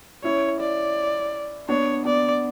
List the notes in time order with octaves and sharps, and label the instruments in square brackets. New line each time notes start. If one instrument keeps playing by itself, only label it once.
[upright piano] C#4 E4 [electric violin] C#5
[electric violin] D5
[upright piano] B3 D4 [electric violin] C#5
[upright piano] B3 D4 [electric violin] D5